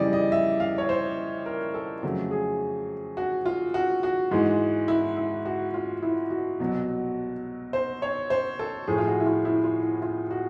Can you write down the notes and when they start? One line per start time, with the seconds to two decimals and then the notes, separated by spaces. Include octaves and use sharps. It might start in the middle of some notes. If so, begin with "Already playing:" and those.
Already playing: F2 C#3 E3 G3 D5 D#5
0.13 D#5
0.32 E5
0.60 F5
0.78 C#5
0.89 C5
1.46 A#4
1.74 A4
2.03 F2 C#3 F#3 A3
2.31 G#4
3.17 F#4
3.46 F4
3.74 F#4
4.03 F#4
4.31 G#2 E3 G#3
4.88 E4
5.17 E4
5.46 F#4
5.74 F4
6.02 E4
6.30 F#4
6.60 C2 B2 F#3
7.73 C5
8.02 C#5
8.30 C5
8.59 A4
8.87 A2 F3 A3 G#4
8.98 F4
9.07 F#4
9.20 E4
9.26 F4
9.45 E4
9.64 F4
9.83 E4
10.02 F4
10.31 F#4